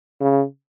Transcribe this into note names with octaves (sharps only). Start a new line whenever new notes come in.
C#3